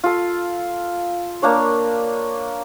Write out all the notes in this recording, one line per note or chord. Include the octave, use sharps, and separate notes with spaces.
F4 A4
A#3 D4 C#5